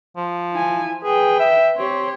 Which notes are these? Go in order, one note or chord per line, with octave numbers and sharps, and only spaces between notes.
F3
E4 G#5
G#4 B4 G5
E5
C4 G4 C#5